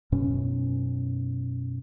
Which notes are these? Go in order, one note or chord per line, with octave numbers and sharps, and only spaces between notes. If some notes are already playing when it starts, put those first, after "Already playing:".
F#2 B2 C#4